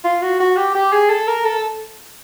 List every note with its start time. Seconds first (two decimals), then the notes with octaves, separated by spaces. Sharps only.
0.04 F4
0.22 F#4
0.40 F#4
0.56 G4
0.75 G4
0.92 G#4
1.10 A4
1.28 A#4
1.45 A4